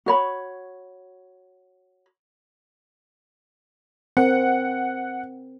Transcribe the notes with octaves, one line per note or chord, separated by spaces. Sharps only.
F#4 C#5 B5
C4 A#4 F#5